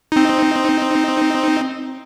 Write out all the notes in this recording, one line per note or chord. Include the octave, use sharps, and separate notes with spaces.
C4 D#4